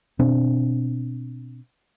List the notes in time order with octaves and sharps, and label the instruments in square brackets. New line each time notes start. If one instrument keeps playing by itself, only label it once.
[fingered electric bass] B2 C4 D4